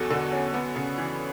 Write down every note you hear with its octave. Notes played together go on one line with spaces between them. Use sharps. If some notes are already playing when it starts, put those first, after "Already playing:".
Already playing: E2 B2 F#3 F#4 A4
D3
C#4
B3
C#3
E3